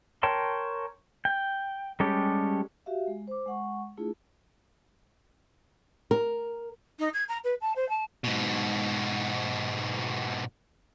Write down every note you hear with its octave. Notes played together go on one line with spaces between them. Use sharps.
A#4 C#5 G5 A5 C6
G5
G3 G#3 C#4 G4 A4
F#4 G4 E5 F5
G#3
C5 D6
G#3 F#5 C#6
A3 D4 E4 F4 G#4
A#4
D#4
G#6
A#5
B4
A5
C5
A5
G#2 B2